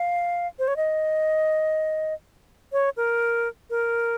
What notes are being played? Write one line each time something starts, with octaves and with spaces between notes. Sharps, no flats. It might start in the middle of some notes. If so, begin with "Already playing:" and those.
Already playing: F5
C5
C#5
D#5
C#5
A#4
A#4